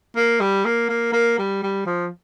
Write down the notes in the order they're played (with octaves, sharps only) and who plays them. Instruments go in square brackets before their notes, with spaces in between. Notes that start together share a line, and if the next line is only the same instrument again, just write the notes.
[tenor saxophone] A#3
G3
A#3
A#3
A#3
G3
G3
F3